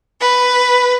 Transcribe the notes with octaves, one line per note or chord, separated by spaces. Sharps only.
B4